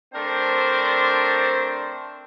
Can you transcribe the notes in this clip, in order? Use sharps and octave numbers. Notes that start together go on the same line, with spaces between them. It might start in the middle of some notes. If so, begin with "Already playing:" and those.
A3 C4 D4 A#4 C5